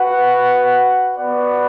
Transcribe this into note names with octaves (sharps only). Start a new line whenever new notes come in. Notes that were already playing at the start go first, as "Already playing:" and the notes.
Already playing: F#4 B4 F#5
B3 F#4 B4 D5 F#5